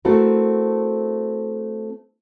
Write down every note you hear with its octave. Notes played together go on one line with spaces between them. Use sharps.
A3 C4 E4 F#4 A#4